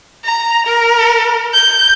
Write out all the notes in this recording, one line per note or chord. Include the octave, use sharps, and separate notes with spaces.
A#5
A#4
G6